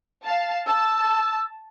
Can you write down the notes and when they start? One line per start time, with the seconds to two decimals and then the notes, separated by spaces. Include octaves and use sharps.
0.24 F5 A5
0.66 A5 E6